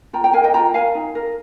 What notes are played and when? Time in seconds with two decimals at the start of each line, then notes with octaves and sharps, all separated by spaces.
0.13 F4 G5 A#5
0.24 G5 A#5
0.33 A#4 F5 G#5
0.44 D#5 G5
0.54 F4 G5 A#5
0.74 A#4 F5 G#5
0.95 D#4
1.15 A#4